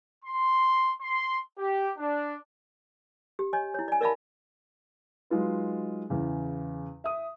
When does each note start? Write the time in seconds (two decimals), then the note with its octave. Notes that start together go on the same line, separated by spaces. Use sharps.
0.25 C6
1.01 C6
1.59 G4
1.98 D4
3.39 G4
3.53 C#5 D#5 G#5
3.74 E4 C#5
3.88 D5 G#5
4.01 A#4 D5 E5 F5 A5 B5
5.30 F#3 G#3 D#4 F4 B4
6.10 E2 C#3
7.04 E5 D#6